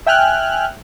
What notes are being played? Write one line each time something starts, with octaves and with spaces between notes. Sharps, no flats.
E5 G5 G#5 F6 F#6